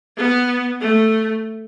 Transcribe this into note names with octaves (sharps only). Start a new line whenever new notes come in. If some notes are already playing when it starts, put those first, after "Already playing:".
B3
A3